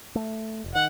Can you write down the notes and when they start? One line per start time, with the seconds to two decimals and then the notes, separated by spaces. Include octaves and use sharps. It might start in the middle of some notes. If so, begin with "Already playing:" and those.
0.15 A3
0.64 F1
0.75 D#3 F#5